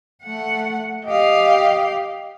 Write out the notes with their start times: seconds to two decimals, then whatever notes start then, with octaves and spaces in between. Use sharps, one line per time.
0.22 A3 F#5
1.05 G4 D#5 F5